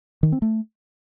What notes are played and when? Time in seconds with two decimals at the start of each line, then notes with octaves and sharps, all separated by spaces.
0.23 D#3
0.32 C4
0.42 A3